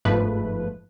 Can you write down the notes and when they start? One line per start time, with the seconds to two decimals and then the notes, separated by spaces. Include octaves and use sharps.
0.05 G1 G#2 F3 A3 B4